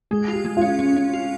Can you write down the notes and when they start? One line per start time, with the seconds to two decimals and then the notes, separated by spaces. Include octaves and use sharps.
0.11 G#3 G#4
0.28 F4 G4
0.45 G#3
0.57 C#4 F4
0.79 C#4
0.96 C#4
1.13 F4